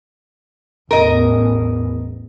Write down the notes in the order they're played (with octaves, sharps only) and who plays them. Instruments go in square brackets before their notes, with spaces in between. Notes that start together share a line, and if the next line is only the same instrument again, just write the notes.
[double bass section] A1 E2 [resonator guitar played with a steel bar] A#4 D#5